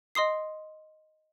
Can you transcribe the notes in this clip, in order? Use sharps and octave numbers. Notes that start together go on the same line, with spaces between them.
D#5 C6 D#6 C7